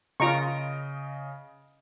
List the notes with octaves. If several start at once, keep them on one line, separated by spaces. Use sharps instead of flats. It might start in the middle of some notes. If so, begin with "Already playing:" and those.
C#3 F4 D#5 A#5 C#6 D7